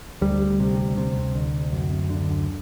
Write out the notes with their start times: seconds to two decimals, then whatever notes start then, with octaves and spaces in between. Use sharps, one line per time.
0.21 D2 G3
0.60 C3
0.98 C3
1.35 D2
1.72 F#2
2.10 D3